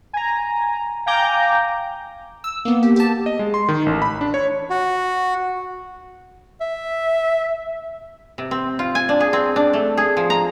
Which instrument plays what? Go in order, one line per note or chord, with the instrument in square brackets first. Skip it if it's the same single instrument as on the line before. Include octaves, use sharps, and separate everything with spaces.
[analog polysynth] G#5 A#5
F5 G5 G#5 A#5 D6 G6
[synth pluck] E6
A#3 B3
G4
G4 A5
[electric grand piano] D#5
G#3
C6
D#3
A1
B5
D4
C#5
[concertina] F#4
[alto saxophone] E5
[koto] C3
C4
F4
G#5
D4
G#4
C4
D4
A3
G#4
F3
A#5